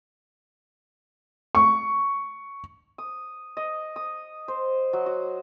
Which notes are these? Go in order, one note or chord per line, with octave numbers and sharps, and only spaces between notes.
C#6
D#6
D#5
D#6
C5
F#3
F#4